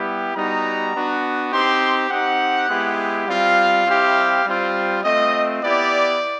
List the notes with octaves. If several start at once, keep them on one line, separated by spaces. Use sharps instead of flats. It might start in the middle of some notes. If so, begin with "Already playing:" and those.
Already playing: G3 B3 E4 G4
G3 B3 D#4 F#4 A#5
B3 D4 F#4
C4 D#4 G4 C6
C4 D#4 G4 F#5
G#3 B3 E4 G4
G3 C4 F4 F5
G3 C4 E4 G4
G3 C4 F4
A3 C4 F4 D#5
B3 E4 G4 D5